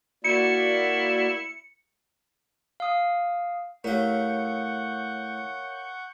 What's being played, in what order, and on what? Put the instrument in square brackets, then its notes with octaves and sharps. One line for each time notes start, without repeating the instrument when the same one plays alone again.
[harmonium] A#3 F#4 D5 [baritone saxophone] E4 [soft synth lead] C#7
[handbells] F5 D#6
[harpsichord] A2 G4 [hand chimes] A#4 C#5 F5 [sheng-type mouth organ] F#5 C#6 G6